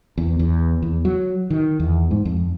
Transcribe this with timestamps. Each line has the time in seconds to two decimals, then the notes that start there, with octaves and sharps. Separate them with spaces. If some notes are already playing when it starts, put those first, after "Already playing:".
0.18 E2
0.39 E2
0.82 E2
1.05 F#3
1.50 D#3
1.80 E2
2.11 G#2
2.25 F2